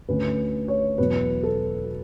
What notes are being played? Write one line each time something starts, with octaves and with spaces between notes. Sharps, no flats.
D2 D3 A3 C#4 B4
C#5
E2 B2 F#3 B3 B4
A4